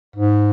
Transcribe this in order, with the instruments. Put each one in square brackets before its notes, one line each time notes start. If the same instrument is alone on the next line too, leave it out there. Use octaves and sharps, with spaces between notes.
[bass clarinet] G#2